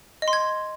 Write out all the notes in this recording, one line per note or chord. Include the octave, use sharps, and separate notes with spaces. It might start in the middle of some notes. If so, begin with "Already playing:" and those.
D#5
C6
G#6